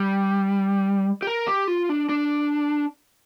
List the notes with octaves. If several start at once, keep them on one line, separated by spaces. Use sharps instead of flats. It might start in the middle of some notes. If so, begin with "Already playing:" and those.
Already playing: G3
G4
A#4
G4
F4
D4
D4